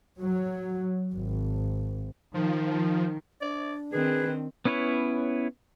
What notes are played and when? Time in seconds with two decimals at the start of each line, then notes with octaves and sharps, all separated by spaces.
0.21 F#3
1.13 G#1
2.34 D#3 F3
3.41 D4 D5
3.92 D#3 C4 G#4 B4
4.65 B3 C#4 E4 B4 C#5